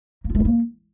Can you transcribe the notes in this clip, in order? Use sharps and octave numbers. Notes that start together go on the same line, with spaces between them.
A#3
F4
A3
E4
A#3